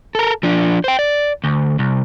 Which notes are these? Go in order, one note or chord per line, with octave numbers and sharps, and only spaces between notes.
A4 A#4
F3 D4
C5 G5
D5
D2
C2